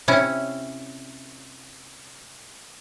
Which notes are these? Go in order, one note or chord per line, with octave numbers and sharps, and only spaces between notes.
C3 C#4 E4